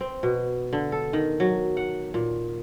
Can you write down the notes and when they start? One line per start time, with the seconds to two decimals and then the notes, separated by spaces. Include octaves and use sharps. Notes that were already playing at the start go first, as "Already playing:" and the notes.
0.01 C4
0.23 B2
0.73 D3
0.92 A4
1.13 D#3
1.40 F#3
1.77 F#5
2.14 A#2